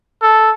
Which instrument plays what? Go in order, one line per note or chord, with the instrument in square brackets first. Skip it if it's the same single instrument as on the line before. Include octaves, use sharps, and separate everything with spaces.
[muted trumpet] A4